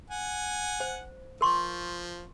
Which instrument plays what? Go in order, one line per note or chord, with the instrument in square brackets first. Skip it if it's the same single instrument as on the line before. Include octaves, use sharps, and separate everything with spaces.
[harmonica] F#5 G#5
[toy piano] C5
[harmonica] F3 [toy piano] A#4 C6 C#6